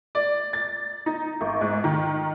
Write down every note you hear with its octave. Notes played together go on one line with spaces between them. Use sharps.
D5
A6
D#4
G#1
G#2
D#3